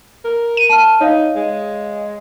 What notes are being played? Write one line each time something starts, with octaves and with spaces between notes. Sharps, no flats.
A#4
D#7
A5 F6
D#4 C#5 F5
G#3